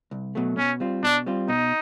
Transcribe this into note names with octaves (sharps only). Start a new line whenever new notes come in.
C2
B2 F#3 A3
B2 C#4
G3 C4 F4
B2 D4
G3 C4 F4
B2 D#4